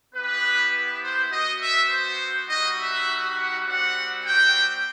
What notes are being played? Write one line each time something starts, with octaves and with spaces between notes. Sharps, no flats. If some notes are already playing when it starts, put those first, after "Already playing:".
B3 E4 G4 B4
C5
B3 F#4 D#5
E5
C5
G3 D#4 F#4 D#5
E5
F#5
G3 C4 F#4 F#5
G5